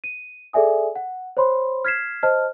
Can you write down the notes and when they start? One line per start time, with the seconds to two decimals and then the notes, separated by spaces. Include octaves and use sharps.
0.04 D#7
0.53 G#4 A4 D5 E5 G#5 D#6
0.96 F#5
1.37 C5 C#5 B5 C6
1.85 F6 G#6 B6 C7 E7
2.23 C5 D#5 A5 F6